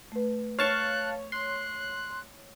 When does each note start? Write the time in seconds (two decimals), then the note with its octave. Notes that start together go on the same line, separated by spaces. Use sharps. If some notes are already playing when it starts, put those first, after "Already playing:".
0.12 A3 B4
0.59 C#5 F5 A5 C#6 F#6
1.32 C6 F#6